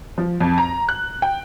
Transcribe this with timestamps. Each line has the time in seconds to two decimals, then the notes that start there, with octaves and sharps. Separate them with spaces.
0.18 F3
0.41 F2
0.58 A#5
0.89 F#6
1.22 G5